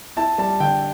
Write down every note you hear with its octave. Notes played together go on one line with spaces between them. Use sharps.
E4 A5
G3 A5
D3 G5